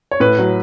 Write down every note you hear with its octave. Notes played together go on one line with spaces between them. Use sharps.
C#5
A2 B4
F#3